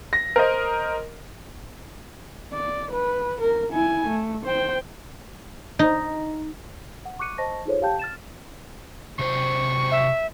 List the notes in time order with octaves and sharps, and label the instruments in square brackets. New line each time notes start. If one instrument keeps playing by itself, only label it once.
[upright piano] A#6
A#4 C5 D#5
[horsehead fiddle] D5
B4
A#4
E4 G#5
A3
C5 G5
[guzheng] D#4
[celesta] F#5
C#6 D6 F#6 C#7 D#7
C5 D#5 A5 C#6 A#6
D#4 F4 G#4 A4 C5 C#5
G4 F5 G5 A5 G6
F6 A6 E7
[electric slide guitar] C3 F#3 C5 [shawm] C#6
[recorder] E5